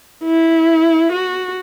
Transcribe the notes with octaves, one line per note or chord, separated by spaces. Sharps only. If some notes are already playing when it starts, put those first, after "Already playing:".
E4
F#4